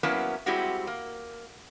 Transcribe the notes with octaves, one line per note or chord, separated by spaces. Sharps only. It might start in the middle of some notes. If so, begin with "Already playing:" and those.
F#3 A#3 B3 C#4 E4
G3 G#3 C4 E4 F#4 G4
A#3